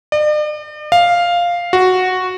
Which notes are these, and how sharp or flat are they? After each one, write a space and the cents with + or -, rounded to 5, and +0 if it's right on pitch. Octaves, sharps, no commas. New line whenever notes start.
D5 +45
F5 +0
F#4 -5